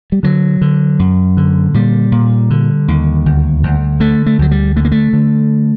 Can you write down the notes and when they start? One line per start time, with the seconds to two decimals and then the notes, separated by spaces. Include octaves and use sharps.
0.12 G3
0.23 D3 F#3
0.61 D3
0.99 F#2
1.37 D3
1.74 A#2 G3
2.12 A#2
2.50 D3
2.88 D#2
3.26 D2
3.63 D2
4.00 D3 A3
4.26 A3
4.39 D2 F#3
4.51 G3
4.76 D3 A3
4.85 A#3
4.92 A3
5.13 D3